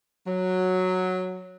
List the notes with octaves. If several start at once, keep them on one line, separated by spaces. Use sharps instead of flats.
F#3